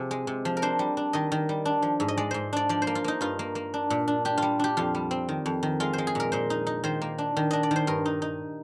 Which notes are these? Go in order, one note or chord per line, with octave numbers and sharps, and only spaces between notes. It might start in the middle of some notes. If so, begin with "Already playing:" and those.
Already playing: C3 F3 G#4
G#3
C3
F3
A#4
D4 C5
G3
D4
D#3 D#5
D#3
G3
D4
F3
G#2
D#5
G#3 D5
G#2 C5
D4 D5
F3 D5
C5
A#3
F4
A#3 D#4
G2 F4
A#3
A#3
D4
A#2
D4
D4 G4
G3 F4
D4 G4
F2 F4
G3
C4
D#3
F2
D#3
G#3 F4
G#3 C5
G#4
A#2 A#4
A#2 C5
D#4
D#4
D#3 C5
A#3
D4
D#3
D4 D#5
D5
D#3 C5
G2 A#4
D#4
D#4